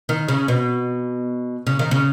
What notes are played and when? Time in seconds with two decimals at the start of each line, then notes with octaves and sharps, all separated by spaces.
0.09 D#3
0.29 C#3
0.48 B2
1.67 C#3
1.79 D#3
1.91 C#3